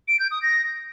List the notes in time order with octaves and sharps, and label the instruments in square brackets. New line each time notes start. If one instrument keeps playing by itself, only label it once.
[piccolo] D7
G6
D#6
A#6